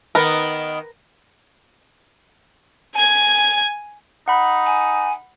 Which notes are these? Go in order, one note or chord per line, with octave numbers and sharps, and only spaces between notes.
D#3 B3 A#4 B4
G#5 G#6
D#4 F#5 B5
G#5